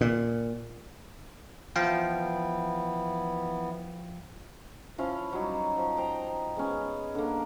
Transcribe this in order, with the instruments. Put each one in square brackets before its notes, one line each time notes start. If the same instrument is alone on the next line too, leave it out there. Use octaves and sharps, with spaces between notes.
[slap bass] A#2
[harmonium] E3 B3 E4 [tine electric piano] F3 F5 G5
[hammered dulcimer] F3 C#4 E4 F5
F#3 G3 D#4
F3
C5 G5 A#5
G#3 B3 C#4
D3 A#3